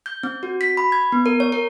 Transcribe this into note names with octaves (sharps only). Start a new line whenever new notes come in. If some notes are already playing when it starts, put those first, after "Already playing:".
G6
C4
F#4
B6
B5
G#6
B3
A#4
C#5
A#4